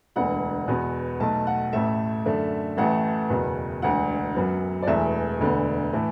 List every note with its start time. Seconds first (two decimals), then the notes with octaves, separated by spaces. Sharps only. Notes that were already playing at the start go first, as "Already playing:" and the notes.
0.16 E1 D2 D3 B3 F#5
0.68 E2 B2 B3
1.20 B1 B2 A3 A5
1.47 F#5
1.73 A1 A2 A3 E5
2.25 F#2 D3 A3
2.77 A1 A2 E3 A3 F#5
3.30 F#1 E2 B2
3.82 E1 D2 D3 F#5
4.35 F#2 F#3 B3
4.82 D5
4.87 E1 E2 E3 A3 E5
5.39 E1 D2 D3 B3
5.93 A2 E3 A3